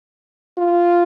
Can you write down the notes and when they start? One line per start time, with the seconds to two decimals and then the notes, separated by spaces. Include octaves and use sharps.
0.58 F4